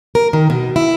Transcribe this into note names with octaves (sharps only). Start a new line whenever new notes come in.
A#4
D#3
B2
E4